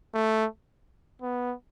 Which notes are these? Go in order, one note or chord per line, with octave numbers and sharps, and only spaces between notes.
A3
B3